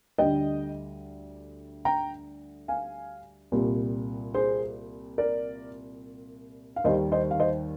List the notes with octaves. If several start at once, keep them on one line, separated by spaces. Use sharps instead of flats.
D2 D3 G3 D#5 G5
G5 A#5
F5 G#5
C2 A#2 G3
G#4 C5
A#4 D5
F5
D#2 D#3 G3 C5 D#5
C5 D#5
F5
C5 D#5